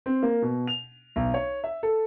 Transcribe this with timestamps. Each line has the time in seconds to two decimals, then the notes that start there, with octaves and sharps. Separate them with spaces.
0.06 C4
0.23 A#3
0.42 B2
0.67 F7
1.16 B1
1.34 C#5
1.64 E5
1.83 A4